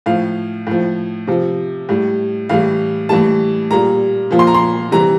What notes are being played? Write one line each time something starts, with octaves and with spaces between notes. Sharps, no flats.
A2 F3 F5
A2 F3
C3 F3
A2 G3
A2 E3 G3 F5
A2 E3 G3 A5
A#2 G3 A#5
A#2 F3
C6
A#5
C6
C3 E3 G3 A#5